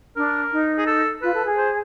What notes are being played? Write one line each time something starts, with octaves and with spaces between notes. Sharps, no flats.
D4 A#4
D#4
G#4
A4
F4 B4
A4
G#4
C5